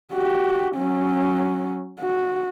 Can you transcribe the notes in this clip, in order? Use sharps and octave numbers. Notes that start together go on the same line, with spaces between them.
F#4 G4
F#3 C#4
F#4